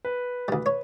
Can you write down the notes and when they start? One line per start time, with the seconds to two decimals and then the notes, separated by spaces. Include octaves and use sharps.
0.05 B4
0.48 D2 G3
0.66 C#5